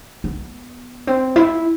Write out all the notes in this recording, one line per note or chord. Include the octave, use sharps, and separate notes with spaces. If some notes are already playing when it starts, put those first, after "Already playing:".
B3
C4
E4